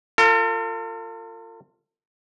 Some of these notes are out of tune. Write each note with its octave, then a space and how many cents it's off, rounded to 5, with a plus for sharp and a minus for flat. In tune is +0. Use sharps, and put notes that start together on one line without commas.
F4 +0 A4 +45